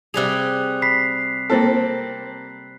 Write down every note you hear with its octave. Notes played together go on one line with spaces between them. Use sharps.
C3 G3 G#4 F#6 F7
B5 B6 C7
A#3 C4 A4